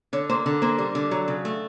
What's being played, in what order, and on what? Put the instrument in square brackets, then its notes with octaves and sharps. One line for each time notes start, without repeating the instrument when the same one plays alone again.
[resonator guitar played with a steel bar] D3 C#5
A#3 C5
D3
A#3 C5
G3
D3
F#3
C#3
A3